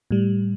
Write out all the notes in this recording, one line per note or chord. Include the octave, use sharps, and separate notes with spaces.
A2 G3